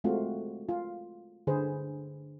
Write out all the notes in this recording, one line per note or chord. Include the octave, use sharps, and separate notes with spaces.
G#3 A3 C4 F4 F#4
F4
D3 G#4 B4 C5